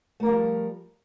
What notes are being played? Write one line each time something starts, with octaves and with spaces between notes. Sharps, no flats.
F3 G3 A3 A#4